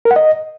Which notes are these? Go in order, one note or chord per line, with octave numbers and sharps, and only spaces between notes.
A#4
F#5
D#5